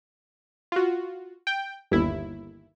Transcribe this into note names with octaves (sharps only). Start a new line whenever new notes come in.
F4 F#4
G5
G1 D#2 E4